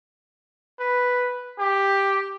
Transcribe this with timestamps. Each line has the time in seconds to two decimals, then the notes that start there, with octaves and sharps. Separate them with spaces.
0.79 B4
1.59 G4